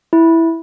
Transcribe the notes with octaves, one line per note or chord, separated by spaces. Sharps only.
E4